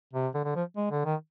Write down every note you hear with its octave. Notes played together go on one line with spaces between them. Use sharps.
C3
D3
D3
F3
G#3
D3
D#3